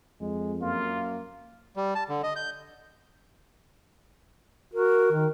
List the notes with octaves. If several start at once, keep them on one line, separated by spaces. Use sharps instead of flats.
F2 G#3
F#2 A#3 F4
G3
A5
D3
D#5
G6
F#4 A#4
D#3